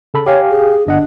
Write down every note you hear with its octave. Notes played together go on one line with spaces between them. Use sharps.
C#3 A4 B5
G4 C#5 F5 G#5
G#4
G1 D4 D#5 F#5